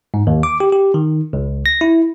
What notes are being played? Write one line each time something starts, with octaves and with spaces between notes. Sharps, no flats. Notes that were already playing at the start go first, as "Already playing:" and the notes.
G#2
D#2
D6
G4
G4
D#3
C#2
A#6
E4